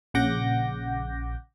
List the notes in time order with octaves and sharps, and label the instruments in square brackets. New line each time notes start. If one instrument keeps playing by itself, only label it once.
[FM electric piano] A#1 C#3 F#5 D6 G6 A#6